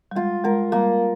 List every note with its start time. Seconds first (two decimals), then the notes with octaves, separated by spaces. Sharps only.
0.11 G3
0.16 G#3 F4
0.44 G#3 A#4
0.72 G3 A#3